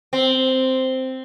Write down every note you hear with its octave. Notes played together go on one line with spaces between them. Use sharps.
C4